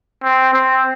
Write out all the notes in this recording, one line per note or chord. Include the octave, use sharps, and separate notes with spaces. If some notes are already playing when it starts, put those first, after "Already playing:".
C4
C4